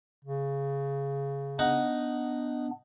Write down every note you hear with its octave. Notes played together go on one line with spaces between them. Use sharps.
C#3
B3 D4 D#4 F#5